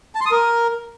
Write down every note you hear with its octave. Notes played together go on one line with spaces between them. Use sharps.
A5
C6
D#6
A#4